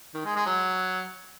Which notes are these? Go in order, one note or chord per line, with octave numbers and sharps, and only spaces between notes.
D#3
G#3
G#3
F#3